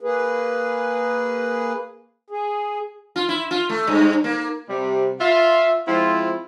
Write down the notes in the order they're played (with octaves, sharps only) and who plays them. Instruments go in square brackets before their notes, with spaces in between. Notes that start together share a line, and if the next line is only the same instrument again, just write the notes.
[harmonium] A#3 G#4 B4
G#4
[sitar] F4
E4
F4
A3
G2
A#3
[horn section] C3 G3
F4 E5 F5
F3 G#3 C4 E4 F4